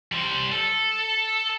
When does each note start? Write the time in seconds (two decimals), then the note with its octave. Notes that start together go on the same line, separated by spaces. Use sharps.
0.12 G3 C5
0.52 A4